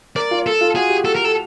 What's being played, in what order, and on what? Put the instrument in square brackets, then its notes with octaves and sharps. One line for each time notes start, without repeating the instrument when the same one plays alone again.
[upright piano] A#4 [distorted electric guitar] D5
[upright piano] F4
[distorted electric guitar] A4
[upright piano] F4
[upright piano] F#4 [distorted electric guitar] G#4
[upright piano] G4
[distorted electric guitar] A4
A#4
A4